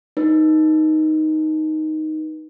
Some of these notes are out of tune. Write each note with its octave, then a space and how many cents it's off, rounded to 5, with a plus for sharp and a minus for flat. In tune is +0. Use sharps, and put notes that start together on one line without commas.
D#4 +0 B4 -25